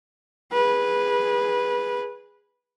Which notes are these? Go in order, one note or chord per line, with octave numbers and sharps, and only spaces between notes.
G#4 B4